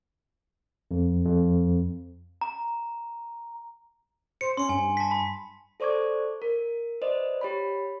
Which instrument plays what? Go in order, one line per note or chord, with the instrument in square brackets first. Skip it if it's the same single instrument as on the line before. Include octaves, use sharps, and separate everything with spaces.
[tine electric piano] F2
F2
[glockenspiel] A#5
[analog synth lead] C5 [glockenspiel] C#7
[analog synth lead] C#4 [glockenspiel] C6 C#7
[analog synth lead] G2 [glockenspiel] G#5
[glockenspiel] A5 B6
B5
[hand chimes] A4 C5 D5 C#6 D6 G#6
A#4
B4 C5 D5 D#5
G4 C#5 B5